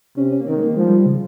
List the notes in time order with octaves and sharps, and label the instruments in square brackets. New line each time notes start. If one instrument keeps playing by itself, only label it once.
[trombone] C3 [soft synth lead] C#4
[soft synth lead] C#4
A#3
[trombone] D#3 [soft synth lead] C4
[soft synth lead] G#3
A#3
[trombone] F3 [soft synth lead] G#3
[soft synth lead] G3
G3
C#3